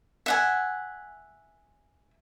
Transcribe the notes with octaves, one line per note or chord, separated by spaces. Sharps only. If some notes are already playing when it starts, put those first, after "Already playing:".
E5 F#5 G#5